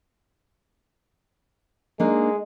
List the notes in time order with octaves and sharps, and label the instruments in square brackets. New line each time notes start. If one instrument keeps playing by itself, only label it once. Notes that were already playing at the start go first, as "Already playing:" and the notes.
[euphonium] G#3 [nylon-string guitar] A#3 D4 D#4